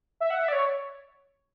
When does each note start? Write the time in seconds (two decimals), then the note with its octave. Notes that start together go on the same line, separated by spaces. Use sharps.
0.21 E5
0.30 F#5
0.42 E5
0.48 D5
0.53 C#5